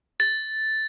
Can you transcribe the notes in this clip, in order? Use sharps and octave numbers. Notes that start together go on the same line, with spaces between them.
A6